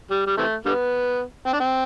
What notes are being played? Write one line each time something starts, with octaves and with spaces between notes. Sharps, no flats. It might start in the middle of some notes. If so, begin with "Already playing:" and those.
G3
G3
C3 E3 A3
D3 G3 B3
C4
D4
C4